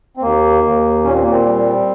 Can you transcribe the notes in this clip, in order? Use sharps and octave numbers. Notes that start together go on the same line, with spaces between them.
C4
D#2 A#3
D#2
A#2 C#4
C4
A#3
C4
G3